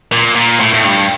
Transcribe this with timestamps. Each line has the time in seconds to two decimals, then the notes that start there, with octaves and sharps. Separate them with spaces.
0.12 A#2
0.36 A#2
0.60 A2
0.74 A2
0.84 G2